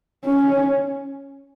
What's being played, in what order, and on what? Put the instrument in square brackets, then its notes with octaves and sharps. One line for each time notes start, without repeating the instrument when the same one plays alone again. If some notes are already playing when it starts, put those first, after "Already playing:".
[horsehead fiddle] C#4